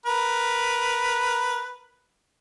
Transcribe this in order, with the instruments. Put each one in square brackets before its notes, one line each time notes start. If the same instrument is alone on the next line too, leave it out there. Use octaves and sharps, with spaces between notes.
[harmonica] A#4 B4